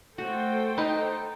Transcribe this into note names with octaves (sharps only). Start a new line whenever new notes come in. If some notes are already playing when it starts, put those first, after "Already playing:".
A3 C#4 F#4 A4 C5 G5
D#4 B4 D#5